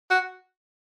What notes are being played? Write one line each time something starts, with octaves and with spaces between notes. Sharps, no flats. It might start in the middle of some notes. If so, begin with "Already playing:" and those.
F#4